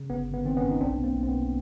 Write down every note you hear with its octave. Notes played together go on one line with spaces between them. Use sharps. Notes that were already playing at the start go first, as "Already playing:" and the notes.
Already playing: C#3
G1 B3
G1
B3
D#3 C4
B3 C#4
G2
D#4
B1 C4 D4
B3
B2
A#3 C4
B1
C4
B3
B2